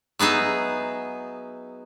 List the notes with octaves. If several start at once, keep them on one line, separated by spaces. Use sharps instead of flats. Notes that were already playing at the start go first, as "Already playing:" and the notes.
F#3 B3 D#4 G#4 E5